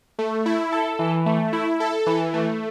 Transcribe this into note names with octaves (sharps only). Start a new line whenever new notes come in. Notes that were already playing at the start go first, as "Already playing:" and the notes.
A3
E4
A4
E3
A3
E4
A4
E3
A3